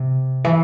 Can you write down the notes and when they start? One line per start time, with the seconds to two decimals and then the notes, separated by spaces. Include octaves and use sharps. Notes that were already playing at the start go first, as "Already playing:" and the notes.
Already playing: C3
0.44 E3